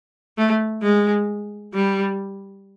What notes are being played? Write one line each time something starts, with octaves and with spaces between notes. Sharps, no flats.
A3
G#3
G3